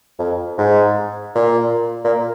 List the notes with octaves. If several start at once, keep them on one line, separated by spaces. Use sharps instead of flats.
F2
G#2
A#2
A#2